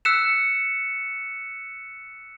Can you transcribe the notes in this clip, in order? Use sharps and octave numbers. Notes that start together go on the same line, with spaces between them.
E6 F#6 B6 C#7 E7